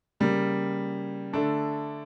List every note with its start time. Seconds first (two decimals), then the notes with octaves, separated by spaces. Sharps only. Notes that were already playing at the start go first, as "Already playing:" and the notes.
0.20 C#3 G3 A#3
1.33 D3 A3 D4 A4